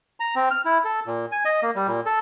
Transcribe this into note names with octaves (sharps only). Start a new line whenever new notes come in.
A#5
C4
F6
E4
A4
A#2
G#5
D#5
A#3
G3
A#2
A4